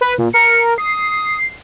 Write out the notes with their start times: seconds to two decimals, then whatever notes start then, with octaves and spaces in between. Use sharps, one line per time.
0.01 B4
0.18 A#2
0.34 A#4 C#7
0.78 D#6 C7